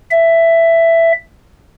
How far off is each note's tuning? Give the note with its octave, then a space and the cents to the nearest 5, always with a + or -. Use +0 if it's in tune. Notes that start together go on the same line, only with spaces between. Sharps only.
E5 +10